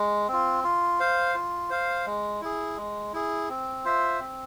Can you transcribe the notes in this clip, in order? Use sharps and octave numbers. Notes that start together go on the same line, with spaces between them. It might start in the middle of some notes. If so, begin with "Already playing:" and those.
Already playing: G#3
C4 F4
F4
C5 F5
F4
C5 F5
G#3
E4 G#4
G#3
E4 G#4
C4
F4 C5 E5
C4